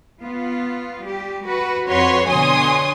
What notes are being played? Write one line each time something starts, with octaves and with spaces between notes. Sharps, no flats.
B3 F4
G3 G4
F#4 B4
F2 F#4 B4 C#5 C6
B2 D3 C#5 G#5 C6 D#6